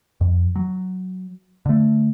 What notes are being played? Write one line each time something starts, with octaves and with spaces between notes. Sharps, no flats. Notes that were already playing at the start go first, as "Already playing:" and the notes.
F2
F#3
D3 A3